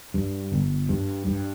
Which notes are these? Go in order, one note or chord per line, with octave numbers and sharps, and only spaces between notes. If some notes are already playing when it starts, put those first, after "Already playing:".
G2
G1
G2
G2